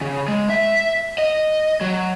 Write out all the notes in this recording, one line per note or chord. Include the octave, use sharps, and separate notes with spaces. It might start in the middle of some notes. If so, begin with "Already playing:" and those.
C#3
G#3
E5
D#5
F#3